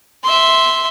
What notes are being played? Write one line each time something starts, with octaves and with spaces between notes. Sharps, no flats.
E5 C6